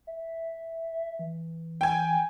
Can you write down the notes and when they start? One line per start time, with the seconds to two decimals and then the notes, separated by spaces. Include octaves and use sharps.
0.07 E5
1.19 E3
1.81 G5 G#5